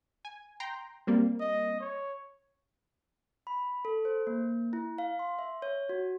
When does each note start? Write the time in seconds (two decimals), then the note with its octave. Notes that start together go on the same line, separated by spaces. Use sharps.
0.25 G#5
0.60 G5 A#5 C6
1.07 G3 A#3 C4
1.40 D#5
1.80 C#5
3.47 B5
3.85 A4
4.05 C5
4.27 A#3
4.73 E4
4.98 F5
5.19 C6
5.39 E5
5.62 C#5
5.89 F#4